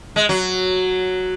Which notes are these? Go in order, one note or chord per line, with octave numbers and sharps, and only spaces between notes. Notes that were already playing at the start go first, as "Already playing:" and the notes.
G#3
F#3